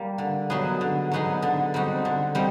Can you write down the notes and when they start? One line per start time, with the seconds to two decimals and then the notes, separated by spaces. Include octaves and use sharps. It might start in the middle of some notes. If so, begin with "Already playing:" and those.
Already playing: G3 A#3
0.18 D3
0.50 F#3 B3 D#4 G#4
0.81 D3
1.12 F#3 B3 D#4 G#4
1.42 D3
1.74 G3 C4 D#4 F#4
2.05 D3
2.35 G3 C4 D#4